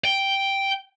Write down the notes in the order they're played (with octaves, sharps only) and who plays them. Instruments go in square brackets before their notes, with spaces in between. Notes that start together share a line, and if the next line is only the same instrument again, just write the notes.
[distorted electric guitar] G5